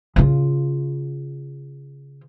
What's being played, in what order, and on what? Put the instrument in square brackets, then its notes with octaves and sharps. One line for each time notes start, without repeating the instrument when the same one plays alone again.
[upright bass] C#3 F4